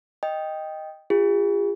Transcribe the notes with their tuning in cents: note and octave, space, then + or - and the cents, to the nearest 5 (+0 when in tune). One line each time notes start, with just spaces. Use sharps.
D#5 +0 G5 +0
F4 +0 G#4 -40